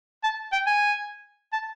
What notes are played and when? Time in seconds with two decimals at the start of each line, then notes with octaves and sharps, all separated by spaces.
0.24 A5
0.52 G5
0.67 G#5
1.53 A5